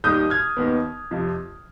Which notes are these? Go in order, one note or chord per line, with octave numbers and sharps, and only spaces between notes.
D#2 D#3 G3 D#6 G6
F6 G#6
D#2 D#3 B3
F2 C3 F3